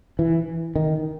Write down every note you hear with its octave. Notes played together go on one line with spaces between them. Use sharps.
E3
D#3